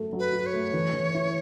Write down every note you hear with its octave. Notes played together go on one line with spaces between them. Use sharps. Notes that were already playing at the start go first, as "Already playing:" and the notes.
Already playing: F#3 A3 A4
F#3
B4
F#4
C#5
A3
E3
E3
E4